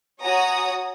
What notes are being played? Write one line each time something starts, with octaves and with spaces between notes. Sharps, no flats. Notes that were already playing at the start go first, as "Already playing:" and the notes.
F#4 C#5 F#5 G#5 A#5 D#6